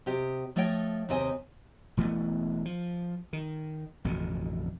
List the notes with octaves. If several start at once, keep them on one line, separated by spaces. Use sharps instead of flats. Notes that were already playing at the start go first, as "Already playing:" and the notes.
C3 G4 D#5
F3 A3 C#5 D#5 G5
D#2 C3 C4 D#5 G#5
E1 E3 A3 B3
F3
D#3
A1 F2 B2 D3